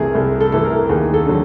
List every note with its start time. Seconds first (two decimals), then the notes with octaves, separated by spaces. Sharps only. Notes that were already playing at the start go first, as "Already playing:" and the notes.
Already playing: C2 C3 E3 A3 G#4 A#4
0.15 C2 A4
0.41 A4
0.52 C3 E3 A3 A4
0.65 A#4
0.89 D#2 G#4
1.14 A4
1.26 D3 F#3